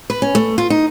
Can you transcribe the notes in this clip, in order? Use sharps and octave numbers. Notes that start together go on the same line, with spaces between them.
B4
C#4
A3
F4
D#4